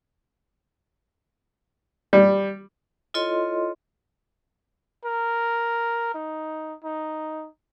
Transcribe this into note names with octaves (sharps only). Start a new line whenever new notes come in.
G3
E4 F4 A4 C#5 D#5 C6
A#4
D#4
D#4